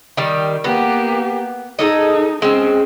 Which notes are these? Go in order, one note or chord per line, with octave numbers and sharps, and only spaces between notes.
D#3 G3
A#3 B3 G4
D#4 G#4 A4 D#5
G#3 C4 C#4